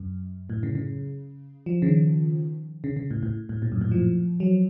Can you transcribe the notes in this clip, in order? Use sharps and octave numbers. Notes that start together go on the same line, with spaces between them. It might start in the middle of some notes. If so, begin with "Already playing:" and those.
Already playing: F#2
A2
C#3
C#3
F3
C#3
D#3
C#3
C#3
A2
A2
A2
A#2
F#2
A2
F3
F#3